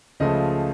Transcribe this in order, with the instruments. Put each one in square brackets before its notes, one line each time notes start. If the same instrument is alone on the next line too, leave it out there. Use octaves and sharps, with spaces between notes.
[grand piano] C#2 C#3 F3 A3 D#5